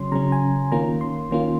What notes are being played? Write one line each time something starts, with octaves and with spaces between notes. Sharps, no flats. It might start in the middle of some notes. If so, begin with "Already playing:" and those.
Already playing: C#3 F#3 C#4 C6
C#3 F#3 C#4 A#5
G#5
D#3 A#3 C#4 F4 A#5
C6
D#3 A#3 C#4 F4